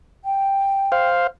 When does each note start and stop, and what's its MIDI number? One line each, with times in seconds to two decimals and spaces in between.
0.25 1.09 79
0.92 1.27 72
0.92 1.27 77